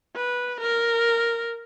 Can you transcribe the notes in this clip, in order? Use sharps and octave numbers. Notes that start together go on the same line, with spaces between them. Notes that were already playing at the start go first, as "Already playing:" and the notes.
B4
A#4